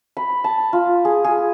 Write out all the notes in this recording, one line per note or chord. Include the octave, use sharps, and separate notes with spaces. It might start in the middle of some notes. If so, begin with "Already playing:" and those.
B5
A5
F4
G#4
G#4